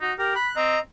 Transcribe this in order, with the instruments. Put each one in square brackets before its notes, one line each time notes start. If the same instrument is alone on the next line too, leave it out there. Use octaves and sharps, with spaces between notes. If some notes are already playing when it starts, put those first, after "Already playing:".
[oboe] D#4 [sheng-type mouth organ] F#4
[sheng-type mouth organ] G4 [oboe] A#4
[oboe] B5 [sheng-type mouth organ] F#6
[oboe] C4 [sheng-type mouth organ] D#5 A#5